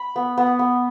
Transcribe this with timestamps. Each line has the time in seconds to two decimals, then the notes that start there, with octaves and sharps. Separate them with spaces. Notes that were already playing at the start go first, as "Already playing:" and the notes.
Already playing: B5
0.16 B3
0.38 B3
0.59 B3